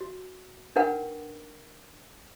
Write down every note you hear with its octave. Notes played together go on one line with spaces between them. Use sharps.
F#4
D4 D#4 A#4 B4 F#5 G5